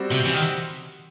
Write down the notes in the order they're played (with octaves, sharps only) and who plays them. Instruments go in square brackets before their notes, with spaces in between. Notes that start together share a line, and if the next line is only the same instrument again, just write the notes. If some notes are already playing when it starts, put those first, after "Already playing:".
Already playing: [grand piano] G3 C4 F#4
[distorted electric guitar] C3
E3
D#3